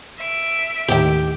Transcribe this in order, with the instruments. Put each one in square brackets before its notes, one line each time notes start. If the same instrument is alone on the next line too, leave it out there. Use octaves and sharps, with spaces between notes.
[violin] E5 D7
[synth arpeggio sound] D#2 A2 D#3 [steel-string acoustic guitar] G4 G5